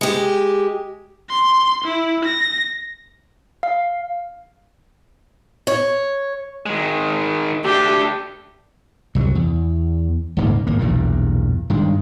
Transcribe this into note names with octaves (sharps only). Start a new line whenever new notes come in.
G#3 G4
C6
E4
A#6
F5
C#5
D#3 G#3
A3 D4 G4
C2 F#3
E2
D#1 G#2 C#3 A#3
G#1 A#3
B1 E2 G2 A#2
G2 D#3 G#3